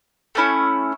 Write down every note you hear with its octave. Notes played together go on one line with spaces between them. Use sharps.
A3 C#4 E4